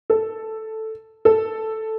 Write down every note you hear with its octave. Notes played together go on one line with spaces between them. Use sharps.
A4
A4